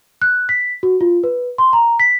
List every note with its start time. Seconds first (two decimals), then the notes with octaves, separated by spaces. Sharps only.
0.22 F#6
0.49 B6
0.83 F#4
1.01 F4
1.24 B4
1.58 C6
1.73 A#5
2.00 B6